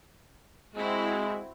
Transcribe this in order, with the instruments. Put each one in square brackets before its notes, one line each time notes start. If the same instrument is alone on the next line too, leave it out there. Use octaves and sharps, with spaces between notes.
[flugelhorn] G#3 [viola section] C4 E4 F#4